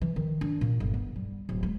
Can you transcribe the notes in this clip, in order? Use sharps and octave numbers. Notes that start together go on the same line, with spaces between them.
E3
D#3
D4
A#2
G1
B3
G3
D1
G#3